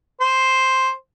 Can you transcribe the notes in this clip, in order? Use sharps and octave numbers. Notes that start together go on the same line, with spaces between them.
C5